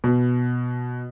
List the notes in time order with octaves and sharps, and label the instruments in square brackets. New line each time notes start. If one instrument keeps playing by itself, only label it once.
[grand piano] B2